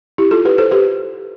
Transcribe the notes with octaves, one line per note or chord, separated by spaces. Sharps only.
E4 G4
F4 A4
G4 B4
A4 C5
G4 B4